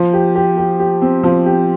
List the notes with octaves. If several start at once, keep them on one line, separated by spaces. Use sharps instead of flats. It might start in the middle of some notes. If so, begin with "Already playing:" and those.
Already playing: F3
G4
G4
G4
G4
C4
F3
G4